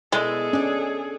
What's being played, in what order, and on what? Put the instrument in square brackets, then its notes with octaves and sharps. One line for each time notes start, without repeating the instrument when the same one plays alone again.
[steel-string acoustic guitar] B2 E4 D5 [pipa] G#3 [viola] G#4 A4
[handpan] C#4 [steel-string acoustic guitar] D4 D5